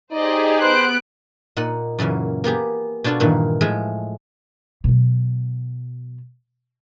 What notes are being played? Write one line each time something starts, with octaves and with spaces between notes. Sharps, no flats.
D#4 G4 G#4 C5 D5 D#5
B3 B4 C5 F#6 D7
A#2 D#4 F#5
F#2 A#2 C#3 E3
A#3 B3 G4 G#4
B2 D4 F4 F#4 A4
G2 A#2 D#3 E3
A2 F3 G#3 G#4 E5
B2 F#3